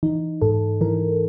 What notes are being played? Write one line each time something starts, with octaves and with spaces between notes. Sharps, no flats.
E3 D#4
G#2 A4
E3 A#4